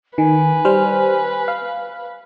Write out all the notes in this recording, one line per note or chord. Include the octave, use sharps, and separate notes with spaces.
D#3 B4 G#5
G3 C5 F6
F5